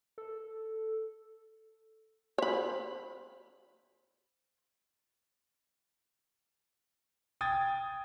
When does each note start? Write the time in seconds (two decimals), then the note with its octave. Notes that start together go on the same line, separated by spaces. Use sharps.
0.18 A4
2.38 C5 B5
7.41 G5 D#6 G#6 A6